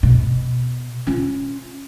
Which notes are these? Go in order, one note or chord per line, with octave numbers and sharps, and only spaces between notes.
B2
C#4 F4